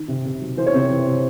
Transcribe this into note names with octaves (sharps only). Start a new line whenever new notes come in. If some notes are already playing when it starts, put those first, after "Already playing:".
Already playing: D#3
C3
C3
F#3
E3 C5
C#5
C3 C4 C5
E3
C3